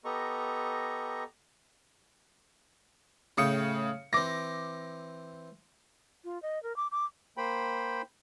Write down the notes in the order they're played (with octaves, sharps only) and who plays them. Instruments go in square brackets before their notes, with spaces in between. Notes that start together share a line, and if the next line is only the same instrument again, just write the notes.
[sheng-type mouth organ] B3 G4 A4 D#5 A#5 C#6
[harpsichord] A2 F5 G5 [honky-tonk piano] C#3 D#6 C#7
[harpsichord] E3 C4 [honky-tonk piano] D6 A#6
[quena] F4
D#5
A#4
D6
D6
[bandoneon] A#3 C5 G5 B5